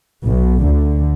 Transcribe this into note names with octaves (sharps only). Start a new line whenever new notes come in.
B1 B2
D2 D3